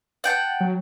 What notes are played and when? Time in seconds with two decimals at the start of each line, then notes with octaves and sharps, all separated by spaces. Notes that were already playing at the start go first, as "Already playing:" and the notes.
0.24 F#5 G5 A5
0.60 F#3